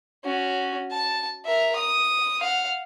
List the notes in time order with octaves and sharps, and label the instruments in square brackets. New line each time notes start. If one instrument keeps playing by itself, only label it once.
[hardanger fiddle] C#4 F#4
A5
A#4 E5
D#6
F5 F#5